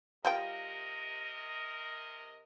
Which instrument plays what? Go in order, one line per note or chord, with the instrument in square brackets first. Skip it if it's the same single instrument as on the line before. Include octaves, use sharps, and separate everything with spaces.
[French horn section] C3 A#4 D#5 [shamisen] G3 F4 G5